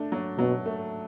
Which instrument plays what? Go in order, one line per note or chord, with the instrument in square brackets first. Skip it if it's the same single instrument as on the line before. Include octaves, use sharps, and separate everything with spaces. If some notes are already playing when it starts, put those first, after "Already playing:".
Already playing: [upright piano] A3 D4
F#3
[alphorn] B2 [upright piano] F#3
[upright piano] A3